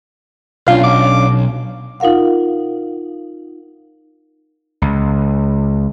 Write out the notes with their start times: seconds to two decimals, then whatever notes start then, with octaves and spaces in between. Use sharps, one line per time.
0.68 B1 C#4 D4 F4 F5
0.84 D6
2.00 D#4 F4 A#4 F5 F#5
4.82 C#2